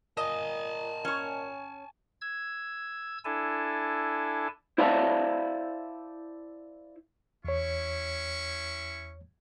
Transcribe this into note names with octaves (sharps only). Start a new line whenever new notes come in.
A#2 D#5 G#5 A5
C#4 C#5
E6 G#6
D4 E4 A4 G#5 A5
E4 C5 D5 E5 F5 A5
E2 C#4 E4 C#5 C#6